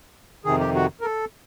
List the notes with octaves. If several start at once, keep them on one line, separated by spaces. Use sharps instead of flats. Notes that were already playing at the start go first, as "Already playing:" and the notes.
F2 C3 D#3 G#4
G4
F#4
A#4
A4